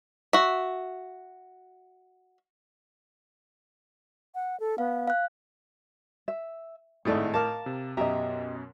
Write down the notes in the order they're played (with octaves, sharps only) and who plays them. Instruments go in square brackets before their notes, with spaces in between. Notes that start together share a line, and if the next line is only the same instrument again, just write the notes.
[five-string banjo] F#4 E5
[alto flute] F#5
A4
[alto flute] B3 [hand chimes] F5
[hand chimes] F5 F#6
[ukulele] E5
[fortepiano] G#1 A3 E4 [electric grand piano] A2 [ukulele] D#4 A4 D5
[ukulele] A#4 F5 [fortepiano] A5 D6 F6
[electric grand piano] C3
[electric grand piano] F#2 B2 [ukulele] G4 D#5 [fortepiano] E5 A#5